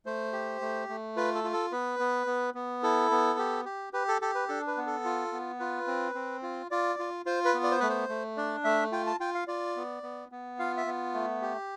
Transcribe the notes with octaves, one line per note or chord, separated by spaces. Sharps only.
A3 C5
G4
A3
A3
F4 B4
A4
F4
A4
B3 B4
B3
B3
B3
E4 A4
B3
G4
G4
G4 B4
A4
G4 A4
B4
D4 A4
B4
B3
A4
F4
B3
F4 B4
C4
C4
F4
F4 D5
F4
F4 C5
B4
B3
D5
C5
A3 B4
C5
A3
D4 D5
A3 E5
F4 G5
A5
F4 G5
F5
F4 D5
B3
B3
B3
F4 F5
E5
B3
A3
G4